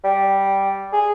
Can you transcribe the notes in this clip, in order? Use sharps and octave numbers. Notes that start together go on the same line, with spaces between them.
G3
G#4